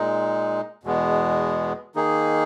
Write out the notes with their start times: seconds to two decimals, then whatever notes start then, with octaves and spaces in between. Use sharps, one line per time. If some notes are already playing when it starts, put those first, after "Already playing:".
Already playing: A#2 G#3 D#4
0.83 E2 B2 G#3 B3
1.95 D#3 A#3 D#4 G#4